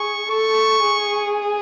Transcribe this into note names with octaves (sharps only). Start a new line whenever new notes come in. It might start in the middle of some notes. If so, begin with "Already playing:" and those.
Already playing: G#4 C#6
A4 C#6
G#4